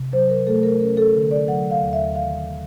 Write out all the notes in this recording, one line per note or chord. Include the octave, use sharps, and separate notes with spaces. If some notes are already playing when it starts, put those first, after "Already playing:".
Already playing: C3
F#3 C5
A#4
A3 A4
A#4
C#4 A#4
A4
D3
D5
F#3 F#5
F5
D#2
E5
D#3 F5